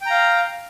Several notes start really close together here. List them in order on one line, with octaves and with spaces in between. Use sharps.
G5 A#5 F5